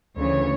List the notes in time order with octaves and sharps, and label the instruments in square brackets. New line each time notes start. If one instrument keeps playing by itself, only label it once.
[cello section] D2 C#3 E3 C#5